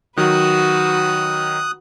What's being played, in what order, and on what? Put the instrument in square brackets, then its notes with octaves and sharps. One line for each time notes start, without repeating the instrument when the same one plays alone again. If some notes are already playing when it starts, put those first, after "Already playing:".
[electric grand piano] D#3 F#3 [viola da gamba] F#4 B4 [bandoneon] D#6 F#6